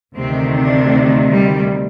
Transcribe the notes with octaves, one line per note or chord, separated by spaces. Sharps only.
D2 C3 D#3 C4
D4
G3